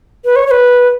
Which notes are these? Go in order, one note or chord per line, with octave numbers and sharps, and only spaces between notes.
B4
C#5
C#5
B4